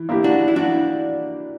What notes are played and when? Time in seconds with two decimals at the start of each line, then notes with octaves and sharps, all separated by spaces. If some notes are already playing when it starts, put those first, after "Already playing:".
Already playing: E3
0.09 A#3 E4 G4
0.24 D4 F#4
0.48 E4
0.56 E3 D4 F#4